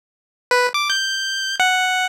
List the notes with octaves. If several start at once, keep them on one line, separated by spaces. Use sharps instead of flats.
B4
D6
G6
F#5